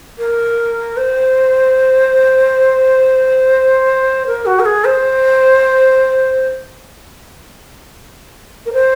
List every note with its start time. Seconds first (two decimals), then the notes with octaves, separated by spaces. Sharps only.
0.18 A#4
0.97 C5
4.27 A#4
4.46 F#4
4.60 A#4
4.65 G#4
4.85 C5
8.66 A#4
8.73 C5